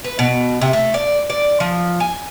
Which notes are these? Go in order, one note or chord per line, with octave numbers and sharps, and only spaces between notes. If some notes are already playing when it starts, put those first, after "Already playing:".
B4
B2
C3
A3
D5
D5
F3
G#5